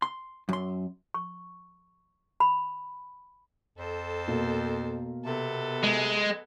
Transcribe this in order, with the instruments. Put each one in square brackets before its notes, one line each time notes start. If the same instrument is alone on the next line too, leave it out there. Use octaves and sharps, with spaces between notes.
[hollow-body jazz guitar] C6
F#2 C6
[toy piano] C#6
B5
[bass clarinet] F2 [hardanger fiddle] A4 C5
[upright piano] B2 A#3
[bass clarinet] C3 [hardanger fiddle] B3 A4
[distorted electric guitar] G#3